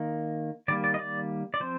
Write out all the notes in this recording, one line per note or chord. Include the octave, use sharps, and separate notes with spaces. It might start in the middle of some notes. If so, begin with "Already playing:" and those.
Already playing: D#3 A#3
D#3 G3 A#3 D5
D5
D#5
D5
D5
F3 C4 C5